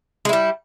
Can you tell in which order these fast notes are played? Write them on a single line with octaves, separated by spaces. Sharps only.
G#3 E4 G3